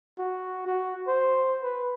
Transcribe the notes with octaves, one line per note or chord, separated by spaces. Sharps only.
F#4
F#4
C5
B4